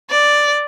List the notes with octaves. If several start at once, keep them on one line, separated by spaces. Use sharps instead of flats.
D5